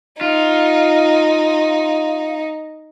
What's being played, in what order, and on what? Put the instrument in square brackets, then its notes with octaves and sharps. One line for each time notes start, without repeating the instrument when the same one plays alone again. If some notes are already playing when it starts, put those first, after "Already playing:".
[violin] D#4 [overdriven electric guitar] F4